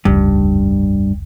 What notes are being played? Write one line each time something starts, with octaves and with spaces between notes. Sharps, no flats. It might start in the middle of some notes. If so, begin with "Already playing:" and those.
F1 C#2 G2